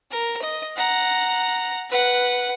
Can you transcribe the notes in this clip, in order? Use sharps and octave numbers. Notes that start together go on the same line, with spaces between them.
A#4
D#5
F#5 A#5
B4 F#5